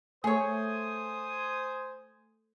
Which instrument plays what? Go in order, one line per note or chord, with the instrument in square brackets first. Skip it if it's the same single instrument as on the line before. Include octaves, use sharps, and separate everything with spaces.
[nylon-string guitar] A3 [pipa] G#4 C#5 [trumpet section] C5 G#5 D#6